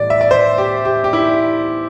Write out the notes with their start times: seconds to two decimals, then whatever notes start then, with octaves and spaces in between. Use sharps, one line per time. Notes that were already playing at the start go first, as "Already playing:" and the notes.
Already playing: A2 E3 G3 D5
0.10 E5
0.21 D5
0.31 C5
0.58 G4
0.85 G4
1.04 G4
1.13 E4